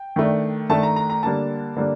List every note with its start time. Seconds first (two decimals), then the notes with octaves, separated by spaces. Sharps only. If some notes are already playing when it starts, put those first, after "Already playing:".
Already playing: G5
0.16 D#3 A3 D4
0.69 D#3 A3 D4 A5
0.83 A#5
0.96 A#5
1.10 A#5
1.23 D3 G3 A#3 D4 A5
1.76 D3 G3 A#3 D4